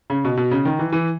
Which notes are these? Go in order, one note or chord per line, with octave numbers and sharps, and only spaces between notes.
C#3
B2
B2
C#3
D#3
E3
E3